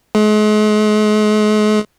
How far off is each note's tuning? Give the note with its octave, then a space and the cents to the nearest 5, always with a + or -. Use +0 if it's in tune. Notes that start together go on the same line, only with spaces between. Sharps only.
G#3 +40